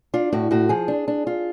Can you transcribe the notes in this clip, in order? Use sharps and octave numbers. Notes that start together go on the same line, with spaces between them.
D4 F4
A2 F#4
A2 F#4
F3 G#4
D4
D4
F4